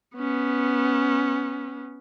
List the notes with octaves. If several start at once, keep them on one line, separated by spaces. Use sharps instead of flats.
B3 C#4